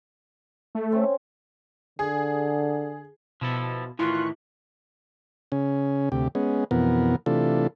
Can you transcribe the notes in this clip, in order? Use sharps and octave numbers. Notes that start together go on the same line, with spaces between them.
A3
C4 C#4
D3 G#4
B2 F3 E4 A4
A2 D#3 E3 E4 F4 C#6 F#6
C#3 C#4
D2 C3 G4
G#3 B3 C#4
F2 B2 E3 B3 A#4
C3 E3 A3 D4 F4 A4